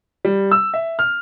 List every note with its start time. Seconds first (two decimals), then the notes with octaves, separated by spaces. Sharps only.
0.25 G3
0.51 E6
0.74 E5
0.99 F6